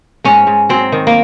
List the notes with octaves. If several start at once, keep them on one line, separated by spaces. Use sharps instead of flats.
G#2 C#4
G#2
F#3 C4
D#3
A#3